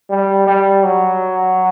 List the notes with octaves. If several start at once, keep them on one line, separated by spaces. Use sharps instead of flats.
G3
G3
F#3